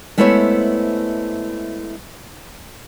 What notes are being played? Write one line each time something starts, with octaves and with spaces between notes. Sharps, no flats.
G#3 A3 B3 E4 C5 C#5